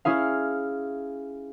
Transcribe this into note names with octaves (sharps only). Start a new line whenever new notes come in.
C#4 E4 G#4 F5